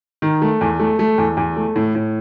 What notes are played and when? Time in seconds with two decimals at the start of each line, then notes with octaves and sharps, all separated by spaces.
0.22 D#3
0.42 A3
0.61 E2
0.79 A3
0.99 A3
1.18 E2
1.37 E2
1.56 A3
1.76 A2
1.95 A2